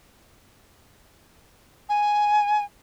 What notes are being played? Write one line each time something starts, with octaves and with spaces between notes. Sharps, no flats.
G#5